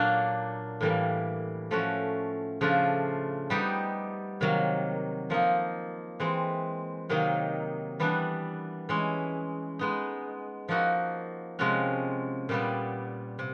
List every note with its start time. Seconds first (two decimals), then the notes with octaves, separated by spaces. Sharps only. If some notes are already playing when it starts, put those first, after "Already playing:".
Already playing: A#2 F#3 A#3 D4
0.81 A2 E3 G3 A#3
1.71 F3 A3 C#4 F#4
2.61 C#3 F3 A3 D4 F4
3.50 G3 B3 D#4 G4
4.41 C3 D#3 F#3 A#3
5.30 F3 A#3 D#4
6.20 E3 G#3 C4
7.10 C3 D#3 F#3 A#3 D#4
8.00 E3 G3 B3 D4
8.89 E3 G#3 C#4
9.79 G#3 B3 D#4
10.69 F3 A#3 D#4 F#4
11.59 C3 F3 G#3 C#4 F#4
12.49 A#2 G3 B3
13.39 C3